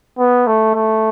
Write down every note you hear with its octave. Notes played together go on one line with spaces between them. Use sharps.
B3
A3
A3